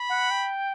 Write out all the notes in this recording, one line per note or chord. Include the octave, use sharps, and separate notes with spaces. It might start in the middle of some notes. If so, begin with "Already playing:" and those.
Already playing: B5
F#5
G5